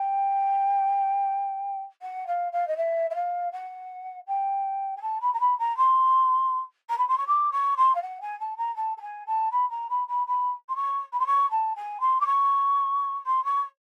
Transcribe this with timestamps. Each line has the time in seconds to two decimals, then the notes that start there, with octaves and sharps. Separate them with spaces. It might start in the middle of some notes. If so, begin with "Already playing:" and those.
Already playing: G5
2.02 F#5
2.27 F5
2.52 F5
2.67 D#5
2.77 E5
3.10 E5
3.15 F5
3.52 F#5
4.27 G5
4.96 G#5
5.01 A5
5.21 B5
5.33 A#5
5.40 B5
5.59 A#5
5.77 C6
6.89 A#5
6.98 B5
7.08 C6
7.17 C#6
7.27 D6
7.52 C#6
7.77 C6
7.95 F5
8.02 F#5
8.21 G#5
8.40 A5
8.57 A#5
8.76 A5
8.97 A5
9.01 G#5
9.26 A5
9.51 B5
9.70 A#5
9.89 B5
10.08 B5
10.27 B5
10.69 C6
10.76 C#6
11.12 B5
11.19 C6
11.26 C#6
11.51 A5
11.76 G#5
12.00 C6
12.20 D6
12.26 C#6
13.26 C6
13.44 C#6